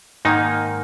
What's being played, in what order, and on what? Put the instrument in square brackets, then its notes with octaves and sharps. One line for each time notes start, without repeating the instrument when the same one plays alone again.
[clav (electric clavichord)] G#2 D#3 A#3 D#4